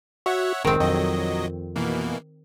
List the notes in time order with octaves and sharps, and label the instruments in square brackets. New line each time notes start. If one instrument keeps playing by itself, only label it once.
[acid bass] F#4 [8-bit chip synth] C#5 E5 F#5
[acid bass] F1 [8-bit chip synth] G#2 G#3 [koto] D#3 C4
[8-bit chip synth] A#1 F#3 D#5 [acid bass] F2
[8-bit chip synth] B2 E3 A#3